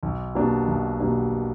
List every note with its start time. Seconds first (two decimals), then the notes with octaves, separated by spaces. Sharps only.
0.03 B1
0.35 B2 G3 A#3 D4
0.68 B1
1.00 B2 G3 A#3 D4